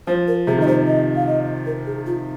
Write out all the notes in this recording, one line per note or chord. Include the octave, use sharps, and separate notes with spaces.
F3 C5
A#4
C3 G#4
D#3 D#5
C3 C5
D#5
F5
D#5
A#4
G#4
F4